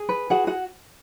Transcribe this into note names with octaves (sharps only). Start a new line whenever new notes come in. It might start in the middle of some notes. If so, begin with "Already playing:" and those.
Already playing: G#4
B4
F#4 G#4 F#5
F#4 F#5